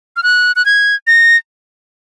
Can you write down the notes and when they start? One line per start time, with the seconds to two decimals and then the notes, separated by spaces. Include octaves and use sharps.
0.16 F6
0.23 F#6
0.56 F#6
0.66 G#6
1.07 A#6